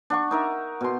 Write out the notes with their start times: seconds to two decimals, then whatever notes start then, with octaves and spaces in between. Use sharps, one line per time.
0.10 D4 F#5 C#6
0.31 D#4 A#4 E5
0.81 B2 C6